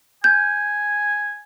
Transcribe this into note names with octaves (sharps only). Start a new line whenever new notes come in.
G#5 G6